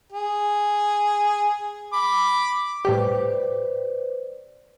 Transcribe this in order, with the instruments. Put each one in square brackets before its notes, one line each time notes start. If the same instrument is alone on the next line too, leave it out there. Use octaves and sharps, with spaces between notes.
[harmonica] G#4
B5 D6
[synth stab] A2 G3 G4 [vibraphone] B4 C5 D5